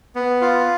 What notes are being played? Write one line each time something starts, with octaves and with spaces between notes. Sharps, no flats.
B3
F4